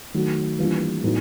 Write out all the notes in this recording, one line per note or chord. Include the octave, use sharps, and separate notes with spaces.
D#3 F#3 A3
E3 G3 A#3 D4 F4
A2 F#3 B3 D#4